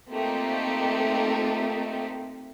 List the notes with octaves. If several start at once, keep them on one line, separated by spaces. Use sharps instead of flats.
A3 A#3 C4 D#4 F4 G4